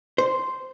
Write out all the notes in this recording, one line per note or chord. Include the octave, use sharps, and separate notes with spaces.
C5